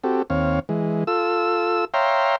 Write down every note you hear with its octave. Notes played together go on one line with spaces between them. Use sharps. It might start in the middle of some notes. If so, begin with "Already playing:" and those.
C4 F#4 G4 A4
D#2 C4 C#5 F5
E3 G#3
F4 A4 E6
C#5 E5 F5 G5 A#5 C6